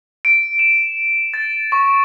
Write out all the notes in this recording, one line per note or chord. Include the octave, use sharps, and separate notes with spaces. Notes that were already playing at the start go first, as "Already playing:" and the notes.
D7
E7
A6
C#6